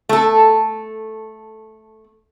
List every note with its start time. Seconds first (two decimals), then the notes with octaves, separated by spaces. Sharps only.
0.09 A3 A4